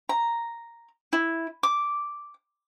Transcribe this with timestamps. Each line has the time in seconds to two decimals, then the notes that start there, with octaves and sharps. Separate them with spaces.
0.09 A#5
1.13 E4
1.63 D6